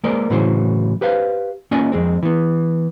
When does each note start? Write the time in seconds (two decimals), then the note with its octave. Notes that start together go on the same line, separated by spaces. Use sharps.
0.04 G#3 A#3 A#4 C5 D5
0.30 A2 C#3 E3 F#3 C5
1.01 G4 B4 C5 F5
1.71 A#3 C#4 F4 D5 D#5 G#5
1.92 F2 G#3 C4
2.23 E3 B3